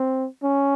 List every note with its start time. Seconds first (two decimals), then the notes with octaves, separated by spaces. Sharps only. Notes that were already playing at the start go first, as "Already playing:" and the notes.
Already playing: C4
0.43 C#4